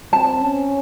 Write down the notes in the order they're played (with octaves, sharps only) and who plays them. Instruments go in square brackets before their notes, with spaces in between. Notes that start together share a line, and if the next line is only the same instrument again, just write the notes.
[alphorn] C4 [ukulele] A5
[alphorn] C#4